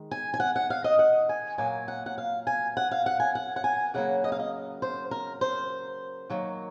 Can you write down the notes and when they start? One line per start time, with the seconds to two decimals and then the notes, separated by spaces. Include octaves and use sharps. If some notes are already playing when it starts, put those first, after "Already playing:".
Already playing: D#3 G#3
0.11 G#5
0.34 G#5
0.40 F#5
0.56 F#5
0.70 F5
0.84 D#5
0.99 F#5
1.29 G#5
1.58 A#2 F#3 A#3 G#5
1.88 F#5
2.06 F#5
2.18 F5
2.47 G#5
2.77 F#5
2.91 F5
3.06 F#5
3.20 G#5
3.35 F#5
3.56 F#5
3.64 G#5
3.94 C#3 F#3 A#3 F#5
4.24 D#5
4.32 F5
4.39 D#5
4.82 C5
5.11 A#4
5.41 C5
6.30 D#3 F#3 A#3